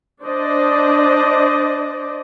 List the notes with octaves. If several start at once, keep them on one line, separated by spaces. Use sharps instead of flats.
D4 C5 D5 D#5